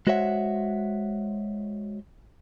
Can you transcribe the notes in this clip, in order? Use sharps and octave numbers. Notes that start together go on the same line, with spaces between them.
G#3 F#4 C5 C#5 E5 F#5